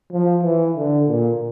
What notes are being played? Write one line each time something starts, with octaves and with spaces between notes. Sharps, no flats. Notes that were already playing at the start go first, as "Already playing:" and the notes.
F3
E3
D3
A#2